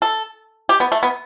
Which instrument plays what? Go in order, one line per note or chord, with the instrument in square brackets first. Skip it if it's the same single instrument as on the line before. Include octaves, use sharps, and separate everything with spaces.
[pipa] A4
G4
B3
A3
B3